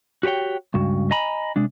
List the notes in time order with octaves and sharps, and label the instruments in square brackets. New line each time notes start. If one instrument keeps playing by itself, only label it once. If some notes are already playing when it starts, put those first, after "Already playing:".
[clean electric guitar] F#4 G4 B4 C#5 G5
C#2 G2 F#4
D#5 G#5 A#5 B5
C3 G#3 D4